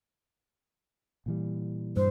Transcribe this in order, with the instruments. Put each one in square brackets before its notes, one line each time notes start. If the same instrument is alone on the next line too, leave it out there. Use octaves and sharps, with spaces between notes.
[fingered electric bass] A#2 E3 G3
[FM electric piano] G2 [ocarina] C5